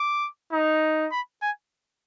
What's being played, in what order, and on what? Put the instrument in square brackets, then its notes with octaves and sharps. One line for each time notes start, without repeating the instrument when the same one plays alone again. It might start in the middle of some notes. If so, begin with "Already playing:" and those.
Already playing: [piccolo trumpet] D6
[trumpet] D#4
[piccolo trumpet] B5
G#5